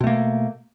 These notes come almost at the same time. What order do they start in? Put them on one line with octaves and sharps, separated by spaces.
B2 A3 A#3